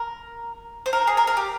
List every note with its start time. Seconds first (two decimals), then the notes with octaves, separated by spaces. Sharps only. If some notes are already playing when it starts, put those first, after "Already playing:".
Already playing: A#4
0.86 C5
0.93 A#4
1.07 G#4
1.17 A#4
1.27 A#4
1.37 G4